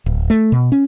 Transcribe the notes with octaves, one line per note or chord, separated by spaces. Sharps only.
D1
A3
B2
C#4